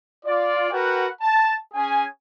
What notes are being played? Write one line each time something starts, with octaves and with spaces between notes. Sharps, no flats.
F4 D5
F#4 A#4 B4 F#5 G5
A5
C#4 G#4 G#5